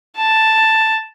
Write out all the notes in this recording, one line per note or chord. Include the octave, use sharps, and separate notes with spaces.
A5